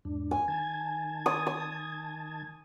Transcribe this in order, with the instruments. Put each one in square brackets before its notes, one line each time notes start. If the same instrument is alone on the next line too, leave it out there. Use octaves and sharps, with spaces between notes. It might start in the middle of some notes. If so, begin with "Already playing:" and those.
[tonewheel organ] E2 G#2 D4
[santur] G#5
[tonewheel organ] D#3 A5 G#6
[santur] D#6
D#6